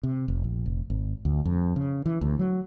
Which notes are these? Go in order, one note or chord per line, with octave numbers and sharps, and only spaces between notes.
C3
F1
A#1
F1
G#1
D2
F2
C#3
E3
D2
F#3